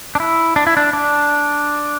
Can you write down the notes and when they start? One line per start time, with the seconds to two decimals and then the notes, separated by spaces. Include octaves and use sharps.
0.15 D4
0.20 E4
0.56 D4
0.67 E4
0.77 D4
0.93 D4